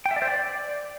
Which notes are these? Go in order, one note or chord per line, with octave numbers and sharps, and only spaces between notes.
G5
E5
D5
C5
D5